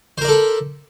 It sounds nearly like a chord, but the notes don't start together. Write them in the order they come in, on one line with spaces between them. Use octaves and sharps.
C5 A#4 D5 A4 B5